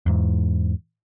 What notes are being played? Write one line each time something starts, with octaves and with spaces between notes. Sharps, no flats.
E2 G#2